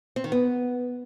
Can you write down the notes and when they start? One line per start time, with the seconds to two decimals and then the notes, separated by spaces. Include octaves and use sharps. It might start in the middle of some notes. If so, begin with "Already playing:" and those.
0.16 C4
0.24 D#3
0.32 B3